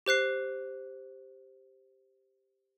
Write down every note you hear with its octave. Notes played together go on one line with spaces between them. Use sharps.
G4 C5 F#6 C7